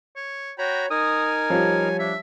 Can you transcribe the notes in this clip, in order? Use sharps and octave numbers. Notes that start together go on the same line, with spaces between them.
C#5
F#4 C#5 G5 A#5 B5
D#4 A#4 G#5 D#6
F3 G3 C#5
D4 E5